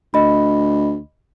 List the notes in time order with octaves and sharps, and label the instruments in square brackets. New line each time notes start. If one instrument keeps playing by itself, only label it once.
[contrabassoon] D2 [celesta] D#5 B5